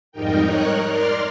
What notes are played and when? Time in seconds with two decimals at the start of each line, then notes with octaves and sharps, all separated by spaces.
0.12 F2 G#2 G3 D#4 A#4 G5
0.41 D#4 A#4 C#5 F#6
0.84 A#4 D5 C6 F6